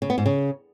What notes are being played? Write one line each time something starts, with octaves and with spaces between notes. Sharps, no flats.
C#3
B3
G#2
C#3